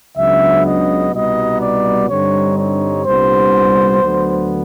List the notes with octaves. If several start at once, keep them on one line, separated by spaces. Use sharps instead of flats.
C#2 C#3 F#3 B3 D4 E5
D#5
C2 B2 G3 B3 D#4 D#5
D5
G2 D3 G3 C4 D#4 C#5
C#5
C2 A#2 G3 B3 D4 C5
D2 D3 F#3 B3